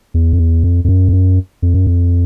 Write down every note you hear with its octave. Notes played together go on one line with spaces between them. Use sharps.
E2
F2
E2
F2
F2
F#2
F2
F#2
F2
F#2
F2